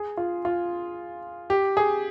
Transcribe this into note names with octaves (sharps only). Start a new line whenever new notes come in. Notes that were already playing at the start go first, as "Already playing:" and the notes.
Already playing: G#4
F4
F4
G4
G#4